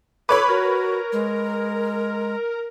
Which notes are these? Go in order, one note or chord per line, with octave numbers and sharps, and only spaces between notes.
A4 B4 C#5 B5 D6
F#4 A#4
G#3